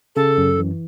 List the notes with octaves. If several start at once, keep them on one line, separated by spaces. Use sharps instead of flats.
C#3 A4
F#2
E3